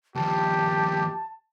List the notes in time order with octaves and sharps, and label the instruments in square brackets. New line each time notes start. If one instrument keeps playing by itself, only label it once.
[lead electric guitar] D#2 F3 [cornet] G4 [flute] A5